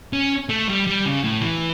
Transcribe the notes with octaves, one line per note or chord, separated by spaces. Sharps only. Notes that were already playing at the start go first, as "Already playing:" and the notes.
C#4
A3
G3
G3
C#3
A2
E3